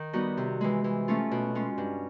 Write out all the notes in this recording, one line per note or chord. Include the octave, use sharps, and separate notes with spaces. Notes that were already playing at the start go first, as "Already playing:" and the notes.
Already playing: D#3
G3 B3 D#4 F#4
C3
E3 G#3
E3
A3 C#4 F4
B2
G#3 C#4 F4
G2